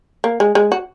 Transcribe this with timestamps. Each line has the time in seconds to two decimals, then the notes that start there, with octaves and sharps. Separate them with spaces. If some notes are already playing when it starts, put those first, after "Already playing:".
0.24 A#3
0.40 G#3
0.55 G#3
0.72 F#4